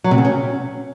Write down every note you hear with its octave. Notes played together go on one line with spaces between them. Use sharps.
F#3
C3
C#3
C#4